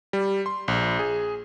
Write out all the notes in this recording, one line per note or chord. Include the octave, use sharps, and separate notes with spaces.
G3
C6
A#1
G#4